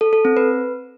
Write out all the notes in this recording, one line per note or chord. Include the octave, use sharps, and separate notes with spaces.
A4
A4
C4
B4